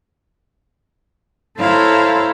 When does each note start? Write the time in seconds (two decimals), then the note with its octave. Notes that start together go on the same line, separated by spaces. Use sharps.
1.58 E4 A4 C5 C#5 F5 A#5